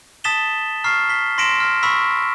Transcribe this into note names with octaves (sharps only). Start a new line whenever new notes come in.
A5 D#6 A6 B6 E7 G7
A#5 C#6 F6 C7
B6 G7
C6 A#6 B6 D7 E7
F6
B5 C#6 E6 B6